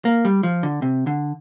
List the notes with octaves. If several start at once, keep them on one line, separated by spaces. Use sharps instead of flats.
A#3
G3
F3
D3
C3
D3